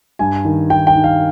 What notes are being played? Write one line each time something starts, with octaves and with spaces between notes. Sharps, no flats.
G2 G#5
D#3
D#3 G5
G5
D#3
F5